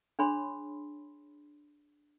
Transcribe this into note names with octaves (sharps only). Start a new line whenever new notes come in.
D4 G#4 C#5 B5 C6